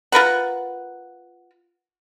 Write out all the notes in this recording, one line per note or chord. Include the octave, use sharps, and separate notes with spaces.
F4 A#4 B4 F#5